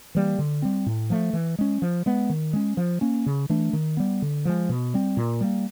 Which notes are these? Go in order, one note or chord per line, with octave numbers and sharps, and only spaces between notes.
E3 G3 A#3
D3
G3 C4
A2
F3 A3
E3
G#3 C#4
F3
G#3 B3
D#3
G#3 C#4
F3
A#3 C#4
C#3
E3 A3 D4
D#3
G3 B3
D3
F3 G#3
B2
G3 C4
A#2
G3 A#3